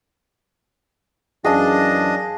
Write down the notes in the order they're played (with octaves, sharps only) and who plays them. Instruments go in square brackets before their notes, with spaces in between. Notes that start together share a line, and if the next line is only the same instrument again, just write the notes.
[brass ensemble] F#2 E3 C#4 [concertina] D4 D#5 [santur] G#4 F5 A5